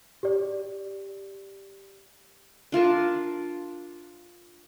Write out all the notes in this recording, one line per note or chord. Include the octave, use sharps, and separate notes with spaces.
G4 D5
D4 F4 A#4 A5